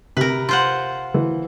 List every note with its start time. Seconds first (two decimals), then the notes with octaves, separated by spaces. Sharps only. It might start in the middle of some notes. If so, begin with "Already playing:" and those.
0.17 C3 A#4 B4
0.49 F4 C5 F#5
1.14 E3